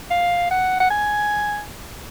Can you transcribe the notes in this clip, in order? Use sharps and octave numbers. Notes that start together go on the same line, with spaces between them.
F5
F#5
F#5
G#5